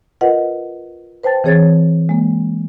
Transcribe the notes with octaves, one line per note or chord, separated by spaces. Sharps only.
F4 A#4 B4 D#5 F#5
B4 C5 G5 A5 A6
E3 C4 G#4 C#5 G#6 A6
G#3 A#3